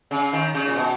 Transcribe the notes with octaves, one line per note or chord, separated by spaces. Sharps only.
C#3
D#3
C#3
A#2
B2